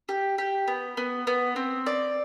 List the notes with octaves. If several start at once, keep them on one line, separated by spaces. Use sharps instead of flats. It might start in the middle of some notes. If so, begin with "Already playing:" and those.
G4
G4
B3
B3
B3
C4
D5